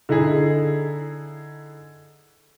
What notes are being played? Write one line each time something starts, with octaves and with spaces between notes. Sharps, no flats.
D3 D#4 E4 G#4